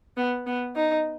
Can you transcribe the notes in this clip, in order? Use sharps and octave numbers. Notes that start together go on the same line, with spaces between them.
B3
B3
D#4